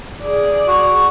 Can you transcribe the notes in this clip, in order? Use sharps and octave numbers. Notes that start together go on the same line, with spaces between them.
G#4 D5
F#4